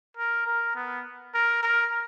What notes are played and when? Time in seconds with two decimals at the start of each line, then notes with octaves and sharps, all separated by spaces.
0.17 A#4
0.46 A#4
0.75 B3
1.34 A#4
1.63 A#4